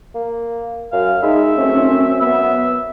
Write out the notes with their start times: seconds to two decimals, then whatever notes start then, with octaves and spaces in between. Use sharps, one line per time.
0.14 A#3
0.92 F#2 F5
1.23 G#3 D#4 E5
1.57 F#2 A3 C4 C#4
2.21 B3 E5